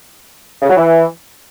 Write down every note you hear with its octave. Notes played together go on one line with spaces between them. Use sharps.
C#3
F#3
E3